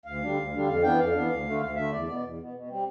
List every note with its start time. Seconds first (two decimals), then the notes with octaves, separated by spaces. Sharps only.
0.06 D2 F5
0.22 D3 G3 D4
0.37 D2
0.53 D3 G3 D4
0.68 F2 F5
0.83 E3 B3 D4 G5
0.98 F2 F5
1.15 E3 B3 D4
1.30 D2
1.46 D3 A3
1.60 D2 F5
1.76 D3 A3 E5
1.91 E2 D5
2.07 B2 B3 D5
2.23 E2
2.38 B2 B3
2.53 B2
2.68 G3 C4